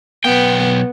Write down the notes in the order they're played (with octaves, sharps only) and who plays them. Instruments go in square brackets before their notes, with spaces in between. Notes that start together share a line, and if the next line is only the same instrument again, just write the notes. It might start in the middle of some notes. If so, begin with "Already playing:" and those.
[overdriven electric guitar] B1 G5 [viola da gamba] B3